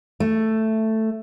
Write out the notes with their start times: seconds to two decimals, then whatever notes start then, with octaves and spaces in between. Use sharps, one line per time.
0.20 A3